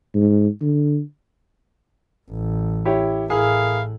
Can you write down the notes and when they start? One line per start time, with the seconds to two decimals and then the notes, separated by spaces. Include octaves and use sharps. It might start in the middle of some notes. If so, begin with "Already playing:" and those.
0.14 G#2
0.62 D3
2.30 A1
2.85 E4 G4 C#5
3.30 A2 E4 G#4 A#4 F5